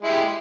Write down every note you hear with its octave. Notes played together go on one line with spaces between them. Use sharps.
G#3 E4 G4